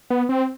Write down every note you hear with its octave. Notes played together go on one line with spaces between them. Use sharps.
B3
C4